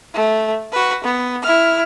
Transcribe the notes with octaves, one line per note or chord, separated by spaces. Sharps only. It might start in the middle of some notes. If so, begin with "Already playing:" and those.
A3
F#4 B4
B3
E4 F6